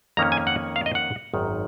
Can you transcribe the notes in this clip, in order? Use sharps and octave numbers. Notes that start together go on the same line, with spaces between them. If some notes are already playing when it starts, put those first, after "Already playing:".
F2 D#3 A#3 C#4 A#5
G#5
F#5
F5
D#5
F#5
G#1 F#2 D#3